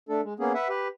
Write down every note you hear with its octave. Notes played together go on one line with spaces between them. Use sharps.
A3 D4 A4
G#3
A#3 B3 C#4 G#4
B4 E5 F#5
G4 B4